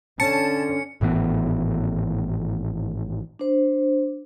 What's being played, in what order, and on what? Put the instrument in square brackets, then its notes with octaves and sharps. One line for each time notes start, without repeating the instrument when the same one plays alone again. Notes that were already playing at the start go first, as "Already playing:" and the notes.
[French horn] D3 [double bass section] C#4 [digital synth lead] A5 [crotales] C#7
[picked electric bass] G#1 A2 E3 B3
[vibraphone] D4 C5